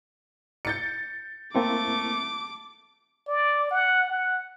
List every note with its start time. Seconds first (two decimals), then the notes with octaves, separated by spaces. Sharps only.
0.65 G6 A6 C#7
1.55 A3 A#3 C4 E4 D6
3.28 D5
3.71 F#5
4.09 F#5